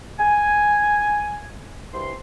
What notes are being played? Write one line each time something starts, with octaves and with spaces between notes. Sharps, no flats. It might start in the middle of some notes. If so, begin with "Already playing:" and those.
G#5
C2 G2 C6